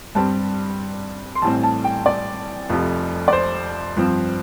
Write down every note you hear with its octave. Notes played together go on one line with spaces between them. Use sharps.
G2 G3 C4 A5
C6
A1 A2 G3 C4 A5
A5
G5
D5
F1 F2 C3 F3
D5
C5
G2 F3 C4